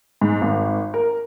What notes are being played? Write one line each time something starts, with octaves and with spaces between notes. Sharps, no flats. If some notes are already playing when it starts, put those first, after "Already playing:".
G#2
G#1
A#4